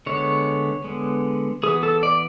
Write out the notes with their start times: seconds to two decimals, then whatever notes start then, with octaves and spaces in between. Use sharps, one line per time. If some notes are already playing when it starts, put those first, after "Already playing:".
0.06 D3 G#3 B3 C#5
0.84 D3 G#3 B3
1.63 E3 B3 G#4
1.83 A4
2.03 D5